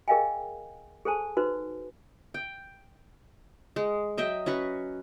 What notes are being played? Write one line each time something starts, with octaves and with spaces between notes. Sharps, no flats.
G#4 A#4 D#5 F5 G5 G#5
G#4 A4 C5 G#5 A5
D#4 F#4 B4 C5
G5
G#3
F#3 D#5 E5 G5
C#4 F#4 B4 C#6